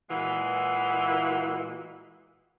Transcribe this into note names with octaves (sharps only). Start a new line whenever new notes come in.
A#2 E3 G#3 F#4